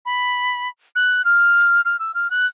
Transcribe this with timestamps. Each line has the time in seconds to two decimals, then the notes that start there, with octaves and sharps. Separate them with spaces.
0.05 B5
0.95 F#6
1.25 F6
1.85 F6
1.99 E6
2.14 F6
2.30 F#6